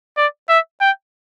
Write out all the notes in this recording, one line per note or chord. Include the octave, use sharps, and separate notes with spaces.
D5
E5
G5